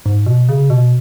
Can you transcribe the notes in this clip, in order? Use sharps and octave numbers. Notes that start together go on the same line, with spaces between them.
G#2
B2
C#3
B2